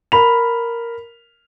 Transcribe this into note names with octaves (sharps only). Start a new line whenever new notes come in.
A#4 B5 F7